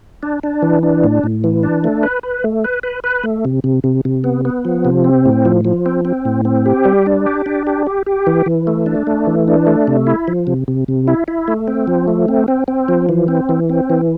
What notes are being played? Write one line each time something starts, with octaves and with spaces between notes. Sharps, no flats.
D4
D4
E3
D4
A2
A2
E3
D4
A3
B4
B4
A3
B4
B4
B4
A3
C3
C3
C3
C3
B3
B3
F3
C3
C4
A2
F3
F3
C4
C4
A2
C4
G4
G3
D4
G4
D4
G4
G4
G4
E3
E3
A3
D4
A3
E3
D4
A3
C3
E4
F3
C3
C3
C3
E4
E4
A3
C4
F3
A3
C4
C4
C4
F3
E3
C4
E3
C4
E3